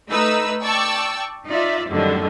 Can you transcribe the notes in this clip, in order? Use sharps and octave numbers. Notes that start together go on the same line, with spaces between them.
A3 D#4 B4 E6
D5 G5 A5 C#6 E6
D#4 F4 D5 E5
F#2 A2 D3 D#3 G3